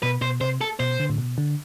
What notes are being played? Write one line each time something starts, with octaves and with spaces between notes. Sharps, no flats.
B2 B4
B2 C5
C3 C5
A4
B2 C5
D3
A2
B2
D3